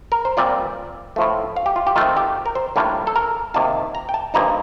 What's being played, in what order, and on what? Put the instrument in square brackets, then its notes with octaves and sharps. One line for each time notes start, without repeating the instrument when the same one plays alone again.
[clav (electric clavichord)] A#4
C5
A#2 G3 C4 F4 D5
A2 F3 A3
F5
G4
F4
G4
D#3 A3 C4 F4
G4
A#4
C5
A2 G3 A#3 D4 F4
A4
A#4
C3 D#3 A#3 F4 A5
A#5
G5
A5
G2 F3 A#3 D#4 A#5